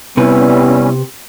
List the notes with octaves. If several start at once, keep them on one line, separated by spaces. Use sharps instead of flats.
C3 G3 B3 C#4 E4 B4